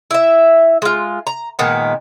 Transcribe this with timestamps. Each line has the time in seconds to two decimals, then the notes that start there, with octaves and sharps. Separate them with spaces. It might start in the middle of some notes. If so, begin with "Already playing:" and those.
0.11 E4 E5
0.82 G#3 F4
1.27 A#5
1.59 A#2 D#3 G#3 B3